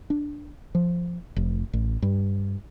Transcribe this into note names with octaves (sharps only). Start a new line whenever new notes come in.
D4
F3
F1
A1
G2